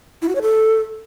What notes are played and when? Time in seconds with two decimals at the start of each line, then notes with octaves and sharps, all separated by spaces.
0.22 E4
0.29 F#4
0.35 C#5
0.42 A4